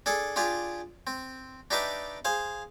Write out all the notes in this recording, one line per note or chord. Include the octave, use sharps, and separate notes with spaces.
D4 G#4 A4
D4 F4 G4 G#4
C4
D4 D#4 G4 B4 E5 A5
G#4 C5 F5